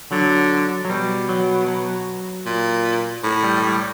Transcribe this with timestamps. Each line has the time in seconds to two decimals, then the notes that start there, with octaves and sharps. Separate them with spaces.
0.12 D3 F#3
0.85 F#3
0.89 B2 G3
1.29 F#3
1.67 F#3
2.46 A#2
3.23 A2
3.44 G3
3.62 G3